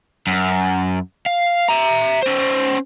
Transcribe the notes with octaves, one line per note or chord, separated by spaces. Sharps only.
F#2
F5
E5 A#5
C#4 C5